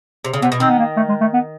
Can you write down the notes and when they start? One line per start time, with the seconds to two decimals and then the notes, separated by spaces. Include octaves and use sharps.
0.25 C3
0.33 C#3
0.42 C3 B3
0.52 B2
0.60 D#3 C4
0.69 B3
0.79 A#3
0.97 A3
1.09 G#3
1.21 A3
1.33 B3